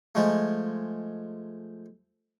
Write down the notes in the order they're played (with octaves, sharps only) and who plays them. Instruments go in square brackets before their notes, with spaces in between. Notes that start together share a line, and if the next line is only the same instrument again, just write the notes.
[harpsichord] F3 G#3 A3